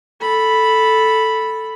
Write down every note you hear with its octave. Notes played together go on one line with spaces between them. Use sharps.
A4 B5